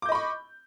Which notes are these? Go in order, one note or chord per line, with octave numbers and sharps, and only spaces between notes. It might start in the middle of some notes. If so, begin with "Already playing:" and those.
D#5 B5 C#6 D6 G6